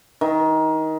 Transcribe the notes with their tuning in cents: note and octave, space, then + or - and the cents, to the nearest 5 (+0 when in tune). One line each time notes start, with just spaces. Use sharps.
D#3 +20